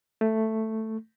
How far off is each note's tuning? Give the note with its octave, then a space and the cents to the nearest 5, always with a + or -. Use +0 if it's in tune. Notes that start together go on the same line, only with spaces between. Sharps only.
A3 +5